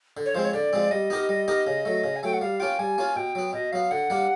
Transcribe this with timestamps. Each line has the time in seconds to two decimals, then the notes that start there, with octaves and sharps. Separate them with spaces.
0.17 D3
0.25 C#5
0.35 F3 G#3 C4 C5
0.44 C#5
0.53 D3 D5
0.73 F3 G#3 C4
0.91 G3 D#5
1.10 B3 D#4 G4 A#4
1.29 G3
1.48 B3 D#4 G4 A#4
1.67 C#3
1.85 F#3 A3
2.04 C#3
2.16 G#5
2.23 F#3 A3 G5
2.33 F#5
2.41 G3 F5
2.60 A#3 C#4 F4 G5
2.79 G3 G#5
2.98 A#3 C#4 F4
3.16 B2 G5
3.35 F#3 B3
3.53 B2 D#5
3.72 F#3 B3 F5
3.91 D3 F#5
4.10 G3 A#3 D4